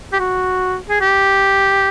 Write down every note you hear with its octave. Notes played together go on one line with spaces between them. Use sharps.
G4
F#4
G#4
G4